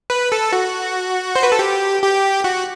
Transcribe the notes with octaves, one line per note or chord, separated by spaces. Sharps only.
B4
A4
F#4
C5
B4
A4
G4
G4
F#4